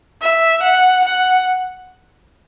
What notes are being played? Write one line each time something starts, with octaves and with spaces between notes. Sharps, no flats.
E5
F#5
F#5